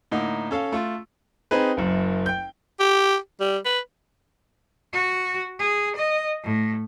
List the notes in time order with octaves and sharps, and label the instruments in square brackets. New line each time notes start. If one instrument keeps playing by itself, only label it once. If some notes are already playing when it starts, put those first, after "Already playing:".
[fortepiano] A2 D3 A#3 D#4
C#4 A4 F5
A3 F4
[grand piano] C4 D#4 G#4 B4
F#1 F#2
G5 G6
[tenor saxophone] G4
G3
B4
[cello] F#4
G#4
D#5
A2